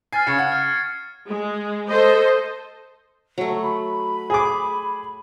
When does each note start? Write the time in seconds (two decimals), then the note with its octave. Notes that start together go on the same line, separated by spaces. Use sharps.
0.13 G#5 F6 A6 C7
0.27 C#3 C#6 G#6 C#7
0.38 F#5
0.52 F6
1.26 G#3
1.87 A4 C5 D#5
3.38 F#3 A3
3.63 B5
4.30 G#4 D6